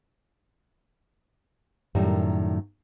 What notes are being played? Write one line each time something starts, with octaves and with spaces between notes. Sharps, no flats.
F#2 A2 D#3 G3